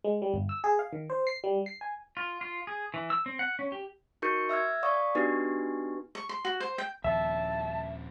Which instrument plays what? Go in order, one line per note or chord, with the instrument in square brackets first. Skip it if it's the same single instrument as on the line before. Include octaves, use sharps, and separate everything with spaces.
[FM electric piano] G#3
G3
G1
E6
G#4
F5
D#3
C5
C7
G3
C7
G#5
[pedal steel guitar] F4
F4
G#4
E3
E6
C4
F#5
C#4
G4
[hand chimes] D#4 F#4 A#4 C#6 G6 C#7
E5 E6 F6 G#6
D5 F5 C#6 D#6
B3 D4 D#4 F#4 G4 B4
[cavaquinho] C#6
C6
F#4
C5
G5
[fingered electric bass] D#1 D#2 F3 [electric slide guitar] E5 [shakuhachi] A5